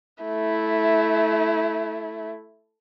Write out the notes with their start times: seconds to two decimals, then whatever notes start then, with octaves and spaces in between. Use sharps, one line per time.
0.24 A3 E4